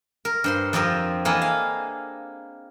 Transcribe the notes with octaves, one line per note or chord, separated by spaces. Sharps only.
A#4
G2 C5 C6
F2 F3 C4 G4 A#4
E3 A#3 D4 G#4 A4 D#5
F5